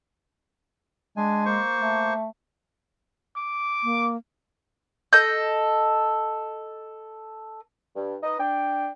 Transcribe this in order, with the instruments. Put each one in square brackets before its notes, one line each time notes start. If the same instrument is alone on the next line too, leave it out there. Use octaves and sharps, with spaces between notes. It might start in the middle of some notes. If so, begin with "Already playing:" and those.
[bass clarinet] G#3 [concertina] D4 G#5
[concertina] A#3 C5 C#6
[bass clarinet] A3
[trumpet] D6
[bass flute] A#3
[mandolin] A4 D#5 G6
[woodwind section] G2
D#4 B4 D#5
D4 G5